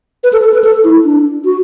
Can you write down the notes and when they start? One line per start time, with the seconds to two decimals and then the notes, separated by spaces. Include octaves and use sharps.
0.24 B4
0.33 A4
0.44 A4
0.54 B4
0.64 A4
0.84 E4
1.05 D4
1.45 F#4